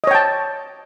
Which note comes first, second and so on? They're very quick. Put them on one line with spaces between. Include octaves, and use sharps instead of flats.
D#5 C#5 G5 A5